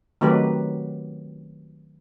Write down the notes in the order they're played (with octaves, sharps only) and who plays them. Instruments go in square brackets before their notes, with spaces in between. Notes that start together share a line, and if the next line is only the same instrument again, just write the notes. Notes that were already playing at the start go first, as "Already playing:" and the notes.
[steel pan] D#3 F#3 A3 C4 G4 B4